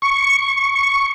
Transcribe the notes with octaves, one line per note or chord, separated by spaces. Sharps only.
C#6